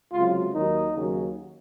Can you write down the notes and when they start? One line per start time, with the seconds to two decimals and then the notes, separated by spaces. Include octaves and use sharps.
0.11 C#2 C3 F#3 F4
0.54 D#2 D#3 F#3 D#4
0.94 D#2 C#3 F#3